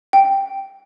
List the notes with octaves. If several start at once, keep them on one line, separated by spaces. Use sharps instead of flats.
G5